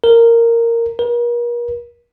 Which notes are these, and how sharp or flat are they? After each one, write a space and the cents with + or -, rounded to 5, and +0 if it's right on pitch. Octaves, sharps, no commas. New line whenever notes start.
A#4 -10
A#4 +40